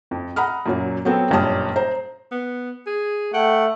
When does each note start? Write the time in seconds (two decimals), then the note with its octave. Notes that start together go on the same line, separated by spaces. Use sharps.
0.11 F2
0.36 F#5 A#5 B5 D#6 F6
0.66 F#2 A#2 F#3
1.05 F#3 B3 C4 A4
1.31 F#1 G2 A#2 C#4 A5 D#6
1.76 C5 A#5
2.31 B3
2.87 G#4
3.34 A3 F#5 G5